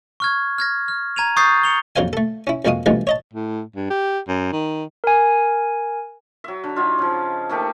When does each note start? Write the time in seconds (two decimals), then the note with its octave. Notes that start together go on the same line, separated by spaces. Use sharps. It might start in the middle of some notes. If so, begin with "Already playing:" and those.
0.20 C#6 F6 G#6
0.58 F6 G#6 A#6
0.88 F6
1.16 A#5 G#6 D#7 F7
1.37 C#6 D#6 G6 A6 C7
1.63 C#7 F7 G7
1.96 A#1 F2 F#3 C5 F5 G#5
2.13 A3 A4
2.47 C#4 E4
2.65 F2 A#2 G#3 F#4 F5 D#6
2.86 G2 B2 E3 F3 G#3 A3
3.07 C#5 D#5 A5
3.33 A2
3.76 G2
3.91 G4
4.28 F#2
4.53 D#3
5.04 A#4 G#5
6.44 F#3 E5
6.64 D3
6.76 F#3 D#4 F4
6.99 C#3 F3
7.49 A3 A#3 D#4 G4